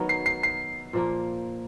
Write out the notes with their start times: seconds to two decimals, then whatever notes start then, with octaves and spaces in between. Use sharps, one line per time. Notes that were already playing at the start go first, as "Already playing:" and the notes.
Already playing: D#3 F#3 A3 B3 D#4
0.09 C7
0.26 C7
0.43 C7
0.93 A#2 F3 A#3